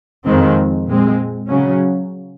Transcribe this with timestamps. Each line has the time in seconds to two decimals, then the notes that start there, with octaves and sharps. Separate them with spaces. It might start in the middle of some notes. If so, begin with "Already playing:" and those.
0.25 F2 D#3 G#3 C4
0.87 A#2 G#3 C4
1.50 C#3 F#3 C#4